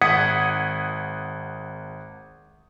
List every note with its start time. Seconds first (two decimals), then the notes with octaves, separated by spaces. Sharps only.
0.01 G#1 F#5 D#6 G#6 B6 C#7